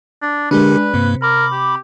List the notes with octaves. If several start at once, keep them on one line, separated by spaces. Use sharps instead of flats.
D4
D3 G#3 D4 G4 A#4 B4
G2 C3 A#3
A#4 B5 D6
G4